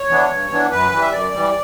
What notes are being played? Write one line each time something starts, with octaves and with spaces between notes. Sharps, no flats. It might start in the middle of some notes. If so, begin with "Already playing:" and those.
Already playing: C#5
E3 B3 D4
G2
E3 B3 D4
F#2 B4
E3 G3
E5
F#2 D5
E3 G3